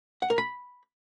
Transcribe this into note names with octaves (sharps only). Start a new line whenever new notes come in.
F#5
A#4
B5